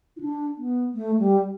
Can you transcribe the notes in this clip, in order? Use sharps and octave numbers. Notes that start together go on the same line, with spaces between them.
E4
D4
B3
A3
G3